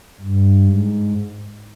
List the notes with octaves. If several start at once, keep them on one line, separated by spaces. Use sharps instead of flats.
G2
G#2